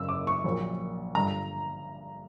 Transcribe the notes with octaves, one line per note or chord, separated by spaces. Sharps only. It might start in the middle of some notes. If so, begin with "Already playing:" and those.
Already playing: F#1 F#2 C#3 E6
D6
C#6
A#1 A#2 F#3
G1 G2 D3 G3 A#5